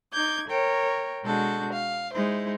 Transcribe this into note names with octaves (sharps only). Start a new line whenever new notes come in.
D#4 D6 G6 G#6
A#4 C#5 G5
B2 G#3 D4 F#4 A4 G6
F5
G#3 D#4 E4 C5